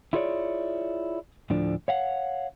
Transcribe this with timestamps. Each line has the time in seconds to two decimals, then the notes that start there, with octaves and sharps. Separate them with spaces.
0.13 E4 F4 G#4 A4 C#5 D5
1.50 D2 A2 D3 F3 D4
1.88 C#5 F5 F#5